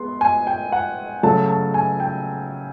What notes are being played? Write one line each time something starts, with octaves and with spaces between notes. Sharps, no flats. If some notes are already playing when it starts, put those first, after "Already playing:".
Already playing: G#3 B3 C6
G#5
G5
F#5
C#3 F#3 A3 A5
A5
G#5
G5